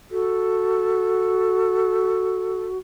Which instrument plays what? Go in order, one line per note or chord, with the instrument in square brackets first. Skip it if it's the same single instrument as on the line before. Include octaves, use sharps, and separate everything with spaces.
[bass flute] F#4 [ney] A4